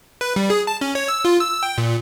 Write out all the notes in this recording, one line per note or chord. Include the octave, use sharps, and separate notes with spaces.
B4
G3
G#4
A5
C#4
C#5
E6
F4
E6
G5
A#2